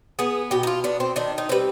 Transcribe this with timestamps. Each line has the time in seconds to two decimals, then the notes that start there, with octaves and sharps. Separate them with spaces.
0.19 B3 G#4
0.51 B2 G4
0.63 D#4
0.67 F4
0.84 B3 D4
1.00 C4
1.16 D#3 D4
1.38 D#4
1.49 G3 C4 B4